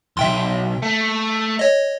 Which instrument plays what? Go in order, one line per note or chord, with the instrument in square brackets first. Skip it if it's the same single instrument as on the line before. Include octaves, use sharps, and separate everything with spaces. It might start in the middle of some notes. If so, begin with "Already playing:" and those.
[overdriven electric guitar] B1 E2 [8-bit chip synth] E5 G5 C6
[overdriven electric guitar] A3
[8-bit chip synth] C#5 D#5